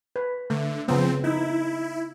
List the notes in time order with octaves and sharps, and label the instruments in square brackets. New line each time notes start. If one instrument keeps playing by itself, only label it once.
[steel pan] B4
[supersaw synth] D3 [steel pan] A3
[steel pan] C#3 B3 [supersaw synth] F3 C4
[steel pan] D#4 [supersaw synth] E4